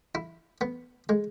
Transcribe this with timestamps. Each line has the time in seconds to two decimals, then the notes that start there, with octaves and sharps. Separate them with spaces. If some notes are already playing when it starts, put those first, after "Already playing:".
0.15 E4
0.61 B3
1.09 G#3